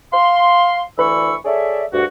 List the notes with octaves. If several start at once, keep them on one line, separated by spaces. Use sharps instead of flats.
F5 C6
D2 E3 D4 B5 C#6 E6
G#4 A4 C#5 D5 E5
D2 G2 F#4